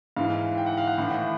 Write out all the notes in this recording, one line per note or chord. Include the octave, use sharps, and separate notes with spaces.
G#2 E3 F5
G5
F#5
F5
F#5
A2 E3